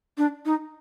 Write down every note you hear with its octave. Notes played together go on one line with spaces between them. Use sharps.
D4
D#4